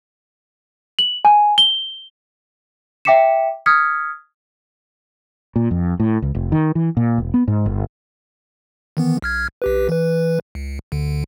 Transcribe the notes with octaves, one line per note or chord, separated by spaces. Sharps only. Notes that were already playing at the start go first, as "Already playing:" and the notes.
F#7
G#5
G7
E5 G5 D6 B6 C#7 E7
D#6 F6 G#6 B6 C#7
A#2
F2
A2
C#2
F1
D#3
E3
A#2
E1
B3
G#2
G1
D#3 E3 B3
B1 F6 G#6
B1 G4 B4
E3 B4
C#2
D2 D3